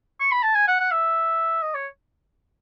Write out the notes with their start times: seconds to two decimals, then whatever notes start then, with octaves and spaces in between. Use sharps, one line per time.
0.20 C#6
0.32 B5
0.43 A5
0.55 G#5
0.68 F#5
0.80 F#5
0.92 E5
1.63 D#5
1.74 C#5